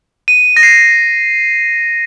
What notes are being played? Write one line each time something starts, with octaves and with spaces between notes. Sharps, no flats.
D#7
A#6
C7